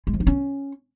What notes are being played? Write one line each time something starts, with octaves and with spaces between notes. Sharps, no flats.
G#3
F3
D#4
C#4